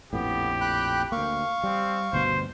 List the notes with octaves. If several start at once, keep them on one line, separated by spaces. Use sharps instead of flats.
A#1 F2 A2 B3 G4
G5 B5 F#6
D2 A#3 F5 C#6
G3 C4
G1 D2 B2 C5